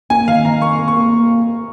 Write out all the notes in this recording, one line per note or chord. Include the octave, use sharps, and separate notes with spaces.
A#3 G#5
D#3 F5
D#3 A#5
A#3 C#6
A#3
C#6
A#3